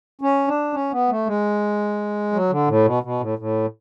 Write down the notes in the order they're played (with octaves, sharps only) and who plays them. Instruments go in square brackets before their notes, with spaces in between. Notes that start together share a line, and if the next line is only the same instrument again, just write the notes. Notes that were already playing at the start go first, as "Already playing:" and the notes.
[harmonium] C#4
D4
C#4
B3
A3
G#3
F#3
D3
A2
B2
B2
A2
A2